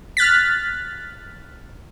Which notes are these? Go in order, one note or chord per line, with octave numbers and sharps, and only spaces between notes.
F6 F#6 A6 B6